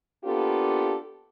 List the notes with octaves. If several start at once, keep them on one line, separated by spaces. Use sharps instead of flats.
A#3 B3 D4 F4 G4 A4